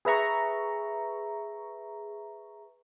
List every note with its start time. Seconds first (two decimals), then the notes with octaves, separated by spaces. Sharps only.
0.05 G#4 B4 E5 A#5 C#6